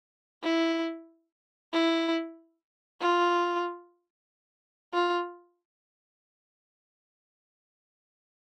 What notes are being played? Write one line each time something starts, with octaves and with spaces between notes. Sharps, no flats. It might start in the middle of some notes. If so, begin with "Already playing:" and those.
E4
E4
F4
F4